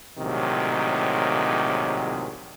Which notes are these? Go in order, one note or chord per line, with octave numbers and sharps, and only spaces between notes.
A#1 A2 C3 D#3 F#3 G#3